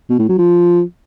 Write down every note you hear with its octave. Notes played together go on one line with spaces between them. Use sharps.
B2
A2
F#3
F3